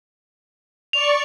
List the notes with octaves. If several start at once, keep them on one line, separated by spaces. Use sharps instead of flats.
D5 C#6 F7